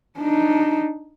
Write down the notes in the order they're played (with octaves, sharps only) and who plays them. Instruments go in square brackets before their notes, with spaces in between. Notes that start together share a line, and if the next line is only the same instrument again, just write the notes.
[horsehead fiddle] D4 D#4